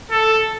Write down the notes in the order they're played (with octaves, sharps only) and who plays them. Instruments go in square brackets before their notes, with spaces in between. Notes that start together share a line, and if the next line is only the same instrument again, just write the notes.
[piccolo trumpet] A4